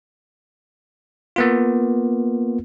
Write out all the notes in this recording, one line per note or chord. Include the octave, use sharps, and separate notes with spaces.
A#3 B3 F4